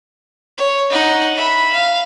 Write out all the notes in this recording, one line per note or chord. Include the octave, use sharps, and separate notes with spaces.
C#5
D#4 F#5
E5 B5
F5